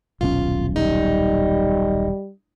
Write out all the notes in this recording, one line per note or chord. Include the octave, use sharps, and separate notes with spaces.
D#1 B1 C#4 F4
G3 D#4